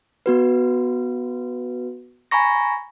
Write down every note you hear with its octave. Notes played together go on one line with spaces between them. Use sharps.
B3 F#4 B4
G#5 A#5 B5 C#6 A#6